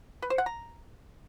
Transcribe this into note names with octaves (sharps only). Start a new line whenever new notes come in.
B4
C5
F#5
A#5